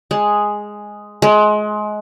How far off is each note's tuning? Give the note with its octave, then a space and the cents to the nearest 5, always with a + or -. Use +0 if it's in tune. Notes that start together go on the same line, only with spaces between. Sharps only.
G#3 +0
G#3 +25